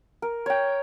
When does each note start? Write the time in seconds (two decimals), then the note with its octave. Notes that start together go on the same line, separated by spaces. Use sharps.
0.22 A#4
0.46 C#5 G5